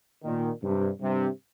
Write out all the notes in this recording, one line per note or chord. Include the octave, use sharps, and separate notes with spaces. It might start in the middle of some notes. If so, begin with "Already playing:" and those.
A#2 D#3
G2 C3
G2 C3